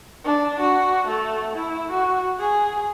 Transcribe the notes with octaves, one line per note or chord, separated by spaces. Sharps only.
D4
F#4
A3
E4
F#4
G#4